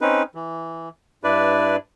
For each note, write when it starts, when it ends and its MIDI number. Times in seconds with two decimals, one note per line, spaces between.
0.01 0.23 60
0.01 0.23 61
0.01 0.23 63
0.01 0.23 71
0.35 0.89 52
1.24 1.76 43
1.24 1.76 62
1.24 1.76 64
1.24 1.76 71
1.24 1.76 74